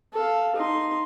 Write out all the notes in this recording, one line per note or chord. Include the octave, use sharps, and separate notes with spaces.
A4 F5
D#4 C6